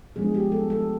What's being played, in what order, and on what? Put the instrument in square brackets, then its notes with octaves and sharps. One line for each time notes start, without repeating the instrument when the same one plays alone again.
[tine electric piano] F3 G#3 B3 D4 [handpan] G#4
[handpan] G4
A4
A4